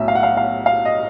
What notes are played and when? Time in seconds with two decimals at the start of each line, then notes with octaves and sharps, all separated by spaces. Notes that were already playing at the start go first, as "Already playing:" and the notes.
Already playing: B1 A2 E5
0.08 F5
0.15 F#5
0.23 F5
0.37 F5
0.66 F5
0.85 D#5